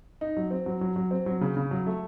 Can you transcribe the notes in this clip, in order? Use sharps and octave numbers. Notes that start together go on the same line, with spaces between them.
D#4
F#3
C4
F#3
F#3
F#3
C4
F#3
C#3
C#3
F#3
A3